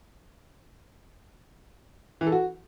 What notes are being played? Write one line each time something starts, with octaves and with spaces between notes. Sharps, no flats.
E3
A4
F#4